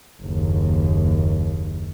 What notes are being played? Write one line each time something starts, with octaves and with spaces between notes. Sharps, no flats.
F#1 D#2